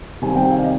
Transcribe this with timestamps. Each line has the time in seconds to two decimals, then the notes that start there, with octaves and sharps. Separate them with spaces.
0.22 C3 D#3 G3 C4 G#5
0.35 G5
0.50 F5
0.58 D5
0.64 D#5